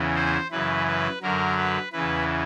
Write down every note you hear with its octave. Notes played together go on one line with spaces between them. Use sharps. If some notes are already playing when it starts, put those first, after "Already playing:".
Already playing: E2 C#3 E3
C5
F#2 C#3 E3 B4
B4
F#2 D3 F#3 A#4
B4
E2 C#3 E3 B4